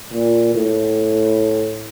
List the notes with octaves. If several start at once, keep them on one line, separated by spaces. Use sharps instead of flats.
A#2
A2